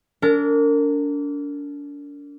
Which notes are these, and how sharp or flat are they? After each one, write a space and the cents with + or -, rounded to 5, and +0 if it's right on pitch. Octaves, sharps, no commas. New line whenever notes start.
D4 -35 A#4 -30